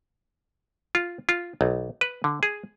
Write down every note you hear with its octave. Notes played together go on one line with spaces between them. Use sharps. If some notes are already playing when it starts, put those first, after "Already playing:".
F4
F4
B1
B4
D3
G#4